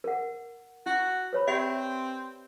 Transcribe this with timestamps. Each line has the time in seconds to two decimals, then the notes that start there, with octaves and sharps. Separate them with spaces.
0.04 A#4 F#5
0.86 E4 F#4
1.33 B4 C#5 B5
1.47 C4 G4 D5 E5